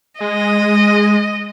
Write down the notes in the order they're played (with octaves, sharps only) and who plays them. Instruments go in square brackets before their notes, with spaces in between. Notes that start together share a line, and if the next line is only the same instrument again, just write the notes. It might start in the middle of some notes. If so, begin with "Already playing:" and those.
[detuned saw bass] G#3 [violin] D#5